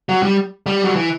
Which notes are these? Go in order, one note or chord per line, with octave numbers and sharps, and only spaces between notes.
F#3
G3
G3
F#3
E3